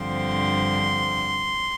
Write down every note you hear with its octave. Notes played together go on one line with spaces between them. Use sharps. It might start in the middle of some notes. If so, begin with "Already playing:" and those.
Already playing: G2 D3 F3 C4 C6